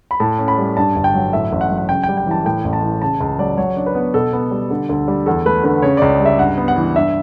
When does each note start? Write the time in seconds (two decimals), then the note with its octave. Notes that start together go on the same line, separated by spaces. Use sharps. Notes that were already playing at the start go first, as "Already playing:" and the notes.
0.11 B5
0.20 A2 A5
0.39 C#4
0.48 B5
0.58 G3
0.77 G2 A5
0.96 G1
1.04 G5
1.15 F#3
1.33 A2 E5
1.52 A1
1.61 F#5
1.70 F#3
1.78 F#5
1.89 C#3 G5
2.03 G5
2.09 G3
2.17 G5
2.27 E3 A5
2.45 A2 G5
2.64 A1
2.73 A5
2.83 E3
3.02 C#3 A5
3.21 C#2
3.39 F#3 D5
3.58 F#3 C#5
3.77 D4
3.86 B4
3.95 B3
4.14 B2 A4
4.33 B3
4.51 G3
4.71 D3
4.89 D2
5.08 G3
5.26 E2 A4
5.46 A3 B4
5.64 D3 B4
5.82 C#3 C#5
5.97 C#2 D5
6.20 G3
6.26 E5
6.39 G2 F#5
6.58 B3
6.68 F#5
6.76 E3
6.96 G2 E5